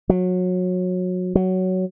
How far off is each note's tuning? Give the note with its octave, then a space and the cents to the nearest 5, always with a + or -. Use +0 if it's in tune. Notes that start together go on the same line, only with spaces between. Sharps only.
F#3 -25
F#3 +10